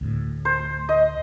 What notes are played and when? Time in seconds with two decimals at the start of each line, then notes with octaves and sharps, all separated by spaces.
0.01 D2 A2
0.45 C5
0.89 D#5